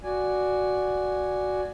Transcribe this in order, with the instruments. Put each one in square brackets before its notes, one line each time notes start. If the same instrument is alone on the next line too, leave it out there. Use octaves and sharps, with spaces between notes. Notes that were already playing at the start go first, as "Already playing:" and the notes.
[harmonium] F#4 D5 G#5